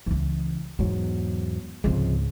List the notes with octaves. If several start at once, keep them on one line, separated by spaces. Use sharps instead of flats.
C#2 E3
E2 G#2 F#3 B3
C#2 G#2 C3 F3 G#3